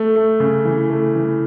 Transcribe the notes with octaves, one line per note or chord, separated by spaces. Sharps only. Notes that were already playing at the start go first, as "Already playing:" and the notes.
Already playing: A3
A3
C#3
E3
A3
E3